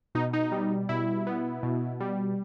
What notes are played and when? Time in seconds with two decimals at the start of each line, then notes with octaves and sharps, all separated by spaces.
0.15 B2 D#4
0.33 D#4
0.52 G3
0.89 B2 E4
1.27 B3
1.63 B2
2.00 G3